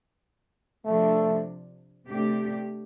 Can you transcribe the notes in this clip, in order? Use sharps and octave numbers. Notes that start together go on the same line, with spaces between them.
C3 F3 A3 D4
C3 A3 D4 G4